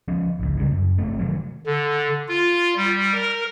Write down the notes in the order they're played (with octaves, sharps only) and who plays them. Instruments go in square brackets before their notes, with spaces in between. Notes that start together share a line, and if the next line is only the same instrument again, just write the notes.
[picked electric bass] F3 B3 C#4
G#1 C#2
C#3 E3 G3
F#2
G1 A3 C4
C3 D#3 E3 F#3
[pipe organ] D3
F4
G3
A#4